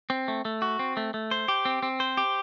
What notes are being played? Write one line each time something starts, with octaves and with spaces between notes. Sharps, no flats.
C4
A3
A3
F#4
C4
A3
A3
C5
G4
C4
C4
C5
G4